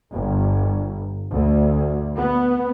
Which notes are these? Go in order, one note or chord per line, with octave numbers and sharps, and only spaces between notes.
G1
D2
B3